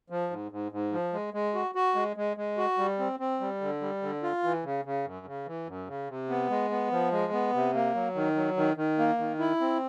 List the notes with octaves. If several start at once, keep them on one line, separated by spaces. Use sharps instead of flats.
F3
G#2
G#2
G#2
F3
G#3
G#3
F#4
F#4
G#3
G#3
G#3
F#4
G3
C4
C4
G3
D3
G3
D3
F4
E3
C#3
C#3
F#2
C#3
E3
F#2
C#3
C3
B3
G#3
B3
F3
G#3
B3
C3
A#3
F#3
D#3
F#3
D#3
D#3
A#3
D#3
E4
C4